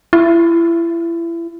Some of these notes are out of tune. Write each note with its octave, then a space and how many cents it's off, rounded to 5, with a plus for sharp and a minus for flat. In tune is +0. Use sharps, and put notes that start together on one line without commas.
E4 +30